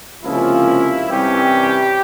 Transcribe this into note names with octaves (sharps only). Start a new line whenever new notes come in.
C#2 C3 F3 A#3 C#4 E4
C2 C3 E3 G3 C#4 G4